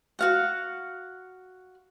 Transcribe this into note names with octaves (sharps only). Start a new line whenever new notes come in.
F#4 F5 F#5